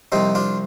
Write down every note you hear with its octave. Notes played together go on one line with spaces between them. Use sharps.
C2 C3 F3 C4 D#4
D4 F4